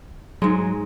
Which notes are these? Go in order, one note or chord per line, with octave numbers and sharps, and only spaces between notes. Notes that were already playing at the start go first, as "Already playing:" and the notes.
G#2 F#3 G#3